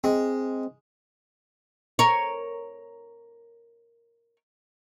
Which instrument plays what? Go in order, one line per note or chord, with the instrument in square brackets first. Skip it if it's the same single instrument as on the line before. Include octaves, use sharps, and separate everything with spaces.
[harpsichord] G#3 [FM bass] C4
[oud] A#4 C#5